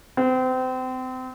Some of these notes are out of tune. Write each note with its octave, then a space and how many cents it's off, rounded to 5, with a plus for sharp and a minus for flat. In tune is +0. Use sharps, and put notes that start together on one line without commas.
C4 -30